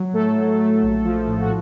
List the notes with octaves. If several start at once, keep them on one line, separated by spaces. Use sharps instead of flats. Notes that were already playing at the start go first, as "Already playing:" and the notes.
Already playing: F#3
A2 A3 A4
F#3
A3
A#1
F3
A2
F#4